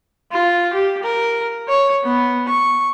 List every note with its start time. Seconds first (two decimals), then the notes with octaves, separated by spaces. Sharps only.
0.32 F4
0.73 G4
1.04 A#4
1.69 C#5
2.04 B3
2.49 C#6